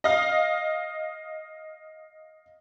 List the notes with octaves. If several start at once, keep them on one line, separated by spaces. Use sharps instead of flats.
D#5 F5